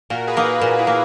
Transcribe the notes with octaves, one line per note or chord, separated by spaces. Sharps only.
A#2 F#4 A#4
G#4 B4
A#3 D#4
G#4 B4
A#2
E4 G#4
A#3